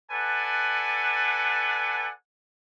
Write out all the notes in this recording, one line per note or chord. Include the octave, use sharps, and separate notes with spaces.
A4 B4 D5 F#5 G#5 A5